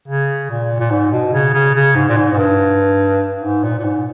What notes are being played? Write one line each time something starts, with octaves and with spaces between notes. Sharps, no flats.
C#3
A#2
A#2
G#2
B2
C#3
C#3
C#3
G#2
A#2
G#2
G#2
G2
G#2
A#2
A#2
G#2